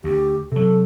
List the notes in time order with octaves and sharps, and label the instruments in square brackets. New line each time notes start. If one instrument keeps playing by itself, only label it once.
[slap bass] D2 [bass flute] G4
[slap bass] C3 F#3 [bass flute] A4